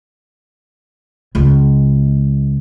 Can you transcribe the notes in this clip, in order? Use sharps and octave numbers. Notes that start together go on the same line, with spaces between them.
C#2 G#3